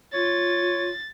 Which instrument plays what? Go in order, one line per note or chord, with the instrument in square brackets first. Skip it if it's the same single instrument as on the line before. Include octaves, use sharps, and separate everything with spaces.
[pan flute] F4 [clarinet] C#5 [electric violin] A6